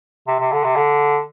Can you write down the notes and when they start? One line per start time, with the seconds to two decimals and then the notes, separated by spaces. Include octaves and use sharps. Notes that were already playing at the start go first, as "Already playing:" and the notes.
0.28 C3
0.40 C3
0.52 D3
0.64 C3
0.76 D3